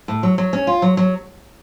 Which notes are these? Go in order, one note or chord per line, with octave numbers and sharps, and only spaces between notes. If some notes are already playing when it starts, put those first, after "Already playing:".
A2
F#3
F#3
C#4
F4
F#3
F#3